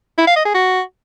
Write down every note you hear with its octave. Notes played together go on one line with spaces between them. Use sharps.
E4
F5
D#5
G#4
F#4